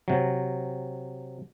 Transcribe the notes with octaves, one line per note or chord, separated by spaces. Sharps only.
C3 F#3